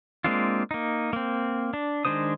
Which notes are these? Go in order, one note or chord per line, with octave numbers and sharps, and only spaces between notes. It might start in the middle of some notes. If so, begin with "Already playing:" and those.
G#3 A#3 C4 D4 F4
A#3 D#4
A#3 C4
D4
D#3 G#3 D4 C5 D#6